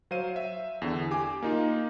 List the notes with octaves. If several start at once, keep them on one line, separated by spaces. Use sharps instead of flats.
F#3 C5 F5 D#7
E5
E2 D3
G4 G#5 D6
A#3 D#4 F4